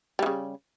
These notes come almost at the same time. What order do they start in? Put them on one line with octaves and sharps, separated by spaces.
G3 E3 C#3